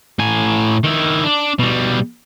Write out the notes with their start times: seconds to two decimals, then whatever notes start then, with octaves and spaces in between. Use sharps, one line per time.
0.19 A2 G#5
0.84 D#3 E4
1.24 D4
1.59 B2 G3